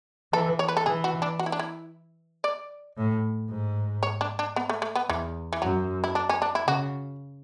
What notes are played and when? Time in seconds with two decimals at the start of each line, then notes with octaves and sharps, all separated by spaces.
0.33 E3 A4
0.59 C#5
0.68 B4
0.77 A4
0.86 E3 G#4
1.04 F#4
1.22 D4
1.39 F#4
1.46 E4
1.52 D4
1.59 E4
2.44 D5
2.98 A2
3.50 G#2
4.03 C#5
4.21 D4
4.39 D4
4.56 B3
4.69 A3
4.82 A3
4.95 B3
5.09 E2 E3
5.53 E3
5.62 F#2 F#3
6.04 E4
6.15 D4
6.29 C#4
6.42 D4
6.55 E4
6.67 C#3 F#4